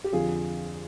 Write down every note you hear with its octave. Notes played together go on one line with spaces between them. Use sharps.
G4
F2 D3 F4 G#4